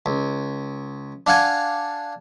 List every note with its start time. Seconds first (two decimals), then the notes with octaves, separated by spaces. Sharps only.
0.06 C#2
1.27 D4 F5 F#5 G#5